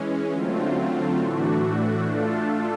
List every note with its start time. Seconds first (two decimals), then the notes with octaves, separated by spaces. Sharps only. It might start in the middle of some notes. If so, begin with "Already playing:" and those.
Already playing: E3 G#3 C#4
0.32 D3 F#3 A3 C4 F4
1.17 A2 E3 A3 D4 F#4
2.05 A3 D4 F4 A4